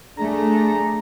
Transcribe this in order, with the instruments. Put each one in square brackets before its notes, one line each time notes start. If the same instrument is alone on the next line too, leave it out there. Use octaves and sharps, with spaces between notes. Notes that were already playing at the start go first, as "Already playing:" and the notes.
[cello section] A3 [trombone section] D4 G#4 [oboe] A#5